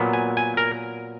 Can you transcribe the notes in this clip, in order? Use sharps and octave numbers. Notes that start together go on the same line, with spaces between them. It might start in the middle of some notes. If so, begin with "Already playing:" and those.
Already playing: A#2 F#3 B3
G#5
G#5
A#4